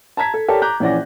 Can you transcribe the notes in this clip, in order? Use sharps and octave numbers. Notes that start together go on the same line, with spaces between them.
A5 A#5 G#6 B6
A4
G4 A4 A#4 C#5 D5 A5
A#5 D6 F#6 G6
A#1 E3 C#4 D5 F#5 A#6